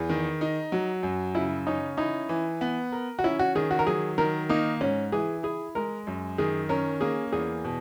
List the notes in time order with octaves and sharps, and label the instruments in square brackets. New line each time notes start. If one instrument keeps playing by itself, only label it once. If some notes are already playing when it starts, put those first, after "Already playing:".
Already playing: [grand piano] E2 [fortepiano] G#4
[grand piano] D#3
D#4
F#3
F#2
[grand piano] C#3 [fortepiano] E4
[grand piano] C#4 [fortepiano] D#4
[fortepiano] D#4 [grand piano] E4
[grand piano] E3
B3
A#4
[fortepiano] F#4
[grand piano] C#4 [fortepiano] E4
[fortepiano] F#4
[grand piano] D#3 [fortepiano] G#4
[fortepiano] F#4
A#4
[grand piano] F#3 [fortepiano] G#4
[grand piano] D#3 [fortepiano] A#4
[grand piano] A#3 [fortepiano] D#4
[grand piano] G#2 [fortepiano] C#4
[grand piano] E3 [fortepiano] G#4
[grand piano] E4 [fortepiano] G#4
[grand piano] G#3 [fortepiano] A#4
[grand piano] F#2
[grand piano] D#3 [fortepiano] G#4
[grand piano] C#4 [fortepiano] A#4
[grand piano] A#3 [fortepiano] G#4
[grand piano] E2 [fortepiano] G#4
[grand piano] B2